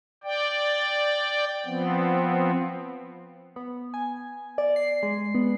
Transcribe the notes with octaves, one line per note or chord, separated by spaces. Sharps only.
D5 G5
F3 B3 C4
B3
G#5
D5
C7
G#3
B3